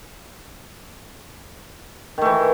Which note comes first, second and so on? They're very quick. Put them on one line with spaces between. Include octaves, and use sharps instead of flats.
D#3 A3 E3